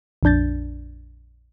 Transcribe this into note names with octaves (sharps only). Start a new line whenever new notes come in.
A#1 F2 D4 G6 A6